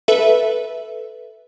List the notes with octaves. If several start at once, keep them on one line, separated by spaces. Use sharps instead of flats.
A4 B4 E5